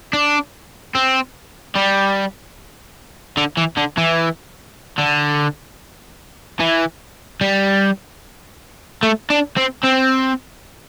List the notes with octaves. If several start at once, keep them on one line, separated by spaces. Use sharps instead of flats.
D4
C4
G3
D3
E3
D3
E3
D3
E3
G3
A3
D4
C4
C4